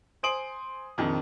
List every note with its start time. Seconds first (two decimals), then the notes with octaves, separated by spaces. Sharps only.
0.23 C5 G#5 C6 D#6 D7 F#7
0.98 A#1 F2 D#3